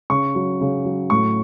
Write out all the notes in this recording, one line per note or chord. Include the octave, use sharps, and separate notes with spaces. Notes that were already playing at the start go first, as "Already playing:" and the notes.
C#3 C#6
F#3
C#3
F#3
A2 C#6